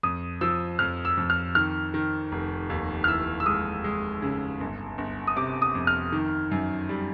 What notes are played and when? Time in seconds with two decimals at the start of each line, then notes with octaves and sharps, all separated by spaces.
0.03 F2 D#6
0.41 F3 E6
0.79 F2 F6
1.05 E6
1.17 F2
1.30 F6
1.55 D#3 F6
1.94 D#3
2.32 F1
2.70 D#2
3.04 F6
3.08 E3 E6
3.40 E6
3.46 G#3 D#6
3.84 G#3
4.22 C#3
4.61 G1
4.98 G1
5.27 D#6
5.36 C3 D6
5.62 D#6
5.75 F2
5.87 F6
6.12 D#3
6.51 F#2
6.89 G3